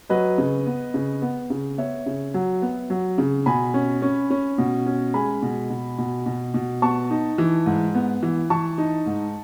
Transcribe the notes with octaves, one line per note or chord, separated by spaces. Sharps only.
F#3 B4 D#5
C#3
B3
C#3
B3
C#3
B3 C#5 E5
C#3
F#3
B3
F#3
C#3
B2 G#5 B5
C#4
C#4
C#4
B2
C#4
G#3 G#5 B5
B2
B2
B2
B2
B2
B3 A5 C#6
D#4
E3
G#2
B3
E3
E3 A5 C#6
D#4
G#2